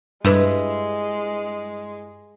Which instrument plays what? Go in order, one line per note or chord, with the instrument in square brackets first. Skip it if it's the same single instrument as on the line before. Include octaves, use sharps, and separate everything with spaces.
[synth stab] G2 [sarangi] G#3 [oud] E4 B4